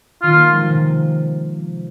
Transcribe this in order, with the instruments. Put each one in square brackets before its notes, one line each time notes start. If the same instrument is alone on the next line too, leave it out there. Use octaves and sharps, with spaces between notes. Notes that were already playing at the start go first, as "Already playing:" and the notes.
[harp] D#3 [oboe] F4
[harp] A#3
G#3
F3
C3